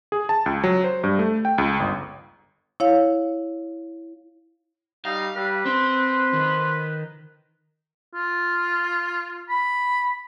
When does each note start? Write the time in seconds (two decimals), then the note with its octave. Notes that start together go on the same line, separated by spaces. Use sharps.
0.12 G#4
0.29 A5
0.46 C#2
0.64 F#3
0.84 C5
1.04 G2
1.19 A3
1.45 G5
1.58 C#2
1.80 G1
2.80 E4 C#5 F5
5.05 G3 D#4 F5
5.36 G3 B4
5.66 C4 C5
6.33 D#3
8.15 F4
9.49 B5